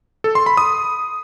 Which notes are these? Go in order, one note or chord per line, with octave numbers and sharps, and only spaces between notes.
A4
C6
B5
D#6